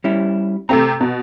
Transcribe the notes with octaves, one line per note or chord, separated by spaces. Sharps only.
G3 C#4 E4
C3 A3 C4 A#5
B2